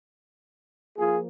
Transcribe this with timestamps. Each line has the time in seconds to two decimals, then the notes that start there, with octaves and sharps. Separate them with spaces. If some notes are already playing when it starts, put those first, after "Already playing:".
0.98 F3 A#3 F4 G#4